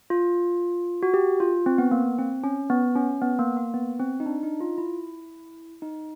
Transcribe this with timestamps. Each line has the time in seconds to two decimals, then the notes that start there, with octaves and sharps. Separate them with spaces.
0.10 F4
1.03 F#4
1.14 G4
1.40 F4
1.66 C4
1.78 B3
1.91 A#3
2.18 C4
2.44 C#4
2.70 B3
2.96 C#4
3.22 B3
3.39 A#3
3.57 A#3
3.74 B3
4.00 C4
4.20 D#4
4.26 D4
4.43 D#4
4.60 F4
4.78 E4
5.82 D#4